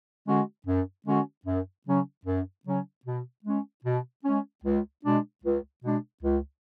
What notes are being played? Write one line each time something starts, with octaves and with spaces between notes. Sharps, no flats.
D3 G#3 C#4 F#4
F#2
D3 G#3 C#4 F#4
F#2
C#3 F#3 C#4
F#2
C#3 F#3 C#4
B2
G#3 C#4
B2
G#3 C#4
C#2
B2 G#3 D4
C#2
B2 G#3 D4
C#2